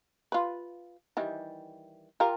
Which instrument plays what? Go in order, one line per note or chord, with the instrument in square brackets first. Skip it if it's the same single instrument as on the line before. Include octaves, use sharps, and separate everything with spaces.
[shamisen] F4 B4
D#3 E3 G3
F4 G4 A#4